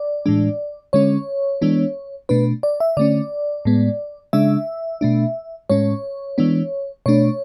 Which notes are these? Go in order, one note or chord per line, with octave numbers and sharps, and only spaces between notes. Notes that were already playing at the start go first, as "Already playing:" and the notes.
Already playing: D5
A2 E3 G#3 D4
D3 G#3 C#4 C#5
E3 G#3 B3 D4
B2 A3 D4 B4
D5
E5
D3 A3 C#4 D5
A2 G#3 B3
C#3 G#3 D4 E5
B2 A3 D4
A2 G#3 C#4 C#5
E3 G#3 B3 D4
B2 A3 D4 C#5